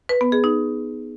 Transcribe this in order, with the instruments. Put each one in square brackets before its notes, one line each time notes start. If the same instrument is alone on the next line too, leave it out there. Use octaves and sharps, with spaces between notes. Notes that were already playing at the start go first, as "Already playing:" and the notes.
[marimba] B4
B3
G#4
D#4